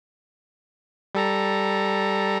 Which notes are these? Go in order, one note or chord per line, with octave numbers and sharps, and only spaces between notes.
G3 A4 A#5